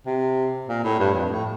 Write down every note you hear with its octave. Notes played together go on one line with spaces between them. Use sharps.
C3
A#2
A2
G2
F2
A2